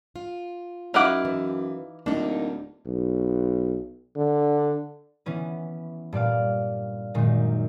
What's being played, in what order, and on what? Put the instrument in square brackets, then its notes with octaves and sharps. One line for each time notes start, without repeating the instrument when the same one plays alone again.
[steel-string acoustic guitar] F4
[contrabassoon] F#2 [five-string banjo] D#4 E4 F#5 [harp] F5 D6
[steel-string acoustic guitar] E3
[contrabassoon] D1 [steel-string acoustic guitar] A#3 D#4 [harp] D4
[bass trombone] B1
D3
[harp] E3 B3 C#4 B4
G2 A#2 D5 F5
F#2 A#2 D#3 G#3